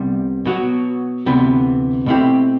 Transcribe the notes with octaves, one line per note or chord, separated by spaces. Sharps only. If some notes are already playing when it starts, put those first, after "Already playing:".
Already playing: C2 C3 G3 B3
B2 F#3 B3 F#4
D2 C3 E3 B3
B2 A3 C4 E4 G4